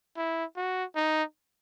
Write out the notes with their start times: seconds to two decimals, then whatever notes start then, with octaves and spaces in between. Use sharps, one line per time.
0.17 E4
0.57 F#4
0.95 D#4